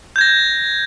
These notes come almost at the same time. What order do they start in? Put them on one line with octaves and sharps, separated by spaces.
G6 G#6 A#6